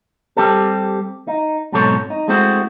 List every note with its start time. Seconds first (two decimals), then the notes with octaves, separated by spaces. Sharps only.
0.37 G3 C4 G4 A4
1.27 D#4
1.72 G#2 B2 F#3 C4 A4 C#5
2.10 D#4
2.28 G#3 A3 C4 E4 F#4